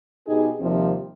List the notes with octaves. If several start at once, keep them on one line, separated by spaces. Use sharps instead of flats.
B2 D#4 G4 G#4
D#2 C3 F3 G3 C4